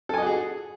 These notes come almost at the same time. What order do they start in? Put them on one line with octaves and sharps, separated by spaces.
A4 G#5 D#5 F#4 G#4